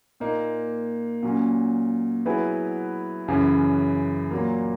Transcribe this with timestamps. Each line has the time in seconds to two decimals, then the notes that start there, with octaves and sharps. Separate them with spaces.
0.20 A#2 A#3 D#4
1.23 A#2 F#3 C#4
2.26 F#3 B3 E4 G#4 B4
3.28 F#2 C#3 E3
4.30 A#2 F#3 A#3